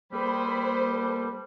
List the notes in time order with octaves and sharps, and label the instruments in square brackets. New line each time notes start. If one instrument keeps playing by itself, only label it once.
[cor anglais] G3 [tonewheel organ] A#3 A4 B4 [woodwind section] C4 G#4 B5 [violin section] C5